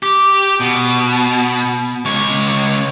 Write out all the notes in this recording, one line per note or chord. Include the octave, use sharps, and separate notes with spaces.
G4
B2
C#2 C#5